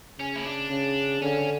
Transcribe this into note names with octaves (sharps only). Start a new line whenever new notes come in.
C#3 C#4
E4
D4
C#3
D3 C#4